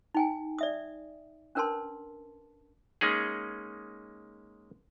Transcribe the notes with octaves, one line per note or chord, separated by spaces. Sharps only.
D#4 G5 G#5
D5 E5 D#6
C#4 D4 A#4 B4 A5 C6
G#3 A#3 C#4 D#4 G#4